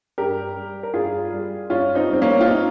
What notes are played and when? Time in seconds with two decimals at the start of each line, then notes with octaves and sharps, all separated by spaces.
0.18 G2 G4 A#4
0.55 G3
0.83 A#4
0.94 G2 F4 G#4
1.33 G3
1.70 G2 C#4 F4
1.95 C4 D#4
2.09 G3 C4
2.22 A#3 C#4
2.41 F4
2.46 C4 D#4